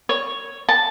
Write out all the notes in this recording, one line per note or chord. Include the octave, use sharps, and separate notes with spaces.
C#5
A5